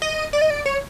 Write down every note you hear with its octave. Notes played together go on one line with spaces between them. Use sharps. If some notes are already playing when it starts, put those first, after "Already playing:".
D#5
D5
D#5
D5
C#5